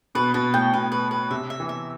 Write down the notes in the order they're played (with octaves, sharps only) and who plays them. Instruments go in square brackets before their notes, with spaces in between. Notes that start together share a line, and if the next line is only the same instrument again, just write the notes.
[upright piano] B2 [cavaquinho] B4
[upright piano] B2 [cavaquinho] B4
[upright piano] A2 [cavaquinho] G5
[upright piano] B2 [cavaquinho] B4
[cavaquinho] B4
B4
[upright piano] C3 [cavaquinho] E5
[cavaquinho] E5
[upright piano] E3
[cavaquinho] E5